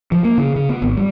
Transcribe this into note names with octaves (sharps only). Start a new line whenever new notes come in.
F3
A#3
C#3
C#3
B3
G#1
G3